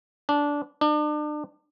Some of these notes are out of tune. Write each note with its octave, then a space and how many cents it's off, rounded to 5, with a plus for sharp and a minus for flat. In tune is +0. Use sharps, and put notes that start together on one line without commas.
D4 -15
D4 +35